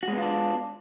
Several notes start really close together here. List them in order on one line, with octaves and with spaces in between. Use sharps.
F#4 G#3 B3 F4 D4